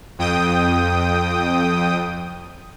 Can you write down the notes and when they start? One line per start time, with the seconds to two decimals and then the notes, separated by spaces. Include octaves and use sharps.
0.19 F2 G5 D#6